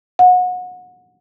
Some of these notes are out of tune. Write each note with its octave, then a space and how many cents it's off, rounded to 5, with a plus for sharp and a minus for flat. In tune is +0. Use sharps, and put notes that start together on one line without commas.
F#5 -30